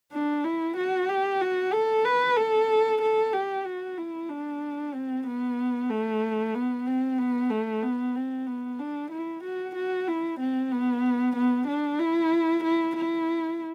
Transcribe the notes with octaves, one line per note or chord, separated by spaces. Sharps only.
D4
E4
F#4
G4
F#4
A4
B4
A4
A4
G4
F#4
E4
D4
C4
B3
A3
B3
C4
B3
A3
B3
C4
B3
D4
E4
F#4
F#4
E4
C4
B3
B3
D4
E4
E4
E4